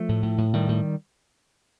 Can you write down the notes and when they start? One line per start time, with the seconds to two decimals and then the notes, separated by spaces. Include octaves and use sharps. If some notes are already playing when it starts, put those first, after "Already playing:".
Already playing: F3 A3
0.09 A2
0.23 A2
0.38 A2
0.53 A2 D#3 G3
0.68 A2